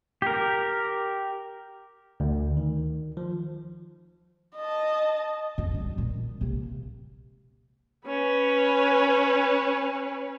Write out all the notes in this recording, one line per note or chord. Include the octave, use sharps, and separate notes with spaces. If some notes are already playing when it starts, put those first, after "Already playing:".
G4 A#4
D2
D#3
F3
D#5 A5
F2
F2 G3
A#2
C3 A#3
C#4 B4